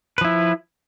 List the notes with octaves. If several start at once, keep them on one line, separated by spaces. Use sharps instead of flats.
F3 E4 B4